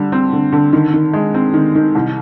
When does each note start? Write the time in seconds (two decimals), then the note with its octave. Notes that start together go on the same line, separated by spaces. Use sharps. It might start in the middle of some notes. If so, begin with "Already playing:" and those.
Already playing: D3 G3
0.12 C4
0.33 D3
0.53 D3
0.73 D#3
0.93 D#3
1.13 G#3
1.34 C4
1.54 D#3
1.75 D#3
1.95 C2